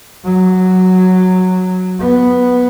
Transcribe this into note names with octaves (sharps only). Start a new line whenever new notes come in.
F#3
B3